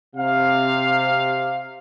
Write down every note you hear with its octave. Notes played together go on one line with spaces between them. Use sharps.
C3 F5